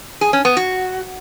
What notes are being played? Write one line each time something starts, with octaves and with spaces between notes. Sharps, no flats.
G#4
C#4
B3
F#4